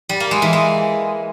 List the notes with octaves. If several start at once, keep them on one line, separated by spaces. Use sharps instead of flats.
G3
A#3
G#3
E3
G#3